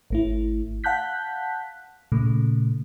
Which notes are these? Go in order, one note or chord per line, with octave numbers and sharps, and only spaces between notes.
G#1 A3 E4
F5 F#5 A5 F#6 G6 B6
A#2 C#3 A3